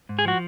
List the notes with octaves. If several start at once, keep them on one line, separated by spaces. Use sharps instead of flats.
G#2
G#4
F3 F#4